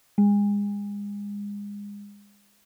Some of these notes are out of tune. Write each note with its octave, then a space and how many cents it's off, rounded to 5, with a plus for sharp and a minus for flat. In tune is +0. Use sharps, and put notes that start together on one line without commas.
G#3 -30